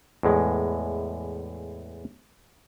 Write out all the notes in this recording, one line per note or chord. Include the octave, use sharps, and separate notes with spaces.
E2 A2 G#3